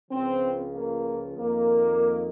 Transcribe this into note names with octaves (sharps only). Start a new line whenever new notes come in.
C#2 C#3 F3 C4
A#3
F2 D#3 A#3